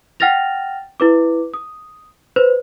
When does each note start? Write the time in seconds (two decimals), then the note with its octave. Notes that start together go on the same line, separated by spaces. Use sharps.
0.20 F#5 G5 F6 A6 A#6 F7
1.00 E4 B4 D6
1.54 D#6
2.36 B4 C5